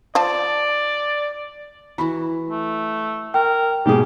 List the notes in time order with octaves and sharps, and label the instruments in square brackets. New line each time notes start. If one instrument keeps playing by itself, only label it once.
[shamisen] F3 A5 [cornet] D5
[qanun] E3 E4 F#4 [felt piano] B5
[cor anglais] A3
[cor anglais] A#4 [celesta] G5
[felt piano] G#2 B2 G#4 [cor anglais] G4